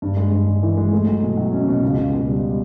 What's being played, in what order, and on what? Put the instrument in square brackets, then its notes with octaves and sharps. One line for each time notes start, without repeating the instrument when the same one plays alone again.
[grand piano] G2
G#3
G2
G2
E3
G#3
A3
F#3
B2
F#3
C#4
B2
C#2
C#2
B2
G3